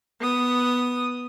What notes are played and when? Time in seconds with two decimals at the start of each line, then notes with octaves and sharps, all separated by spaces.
0.20 B3 D#6